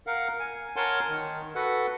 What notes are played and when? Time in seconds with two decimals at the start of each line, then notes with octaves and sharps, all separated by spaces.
0.07 A#4 F5 F#5
0.40 G#5
0.76 A#4 C#5 F#5 G#5 A5 C6
1.09 D#3
1.55 F#4 A4 B4 F#5